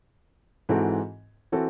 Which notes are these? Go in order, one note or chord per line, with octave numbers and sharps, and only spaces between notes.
G#2 E3 C4 F#4 A4
E3 C4 F#4 A4